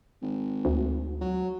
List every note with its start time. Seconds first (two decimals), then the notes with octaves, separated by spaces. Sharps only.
0.22 G#1
0.65 D2
1.21 F#3